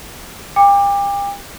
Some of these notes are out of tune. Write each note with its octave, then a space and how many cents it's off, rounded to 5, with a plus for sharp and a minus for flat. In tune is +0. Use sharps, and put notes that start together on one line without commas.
G5 +40 D6 +10